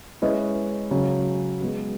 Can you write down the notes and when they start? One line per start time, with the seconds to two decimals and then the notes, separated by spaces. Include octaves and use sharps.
0.22 G#3 C#4 E4 B4 D#5
0.91 C#3 F#3 C#4
1.60 G#3 B3 F#4